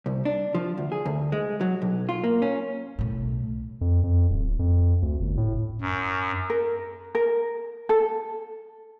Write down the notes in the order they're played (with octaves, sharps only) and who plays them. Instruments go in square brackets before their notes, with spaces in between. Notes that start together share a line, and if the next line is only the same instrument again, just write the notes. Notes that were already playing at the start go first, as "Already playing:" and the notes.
[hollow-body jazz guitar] C2
D4
F3
D2
G#4
D2
G#3
F#3
B1
F4
A#3
C#4
[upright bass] B1 A2
[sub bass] F2
F2
D1
F2
D2
G1
A2
[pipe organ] F#2
[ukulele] A#4
A#4
A4